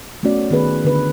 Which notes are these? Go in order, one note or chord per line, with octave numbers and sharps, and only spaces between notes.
A3 B3 C#4 F#4 D5
D#3 B3 G#4 B4
D3 B4